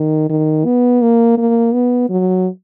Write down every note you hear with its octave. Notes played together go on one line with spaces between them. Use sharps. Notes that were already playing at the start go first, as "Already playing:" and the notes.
Already playing: D#3
D#3
B3
A#3
A#3
B3
F#3